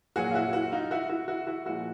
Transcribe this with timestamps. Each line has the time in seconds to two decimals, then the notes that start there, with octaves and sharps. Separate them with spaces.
0.16 A#2 F#3 F#4 G#4
0.31 F4
0.34 E4 F#4
0.53 E4 F#4
0.72 D#4 F4
0.91 E4 F#4
1.09 E4 F#4
1.28 E4 F#4
1.47 E4 F#4
1.66 A#2 F3 G#3 E4 F#4